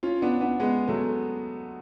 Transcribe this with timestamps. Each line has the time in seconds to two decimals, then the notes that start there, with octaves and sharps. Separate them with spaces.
0.03 C#4 F4
0.22 B3 D4
0.41 B3 D4
0.60 G#3 B3
0.88 F#3 A3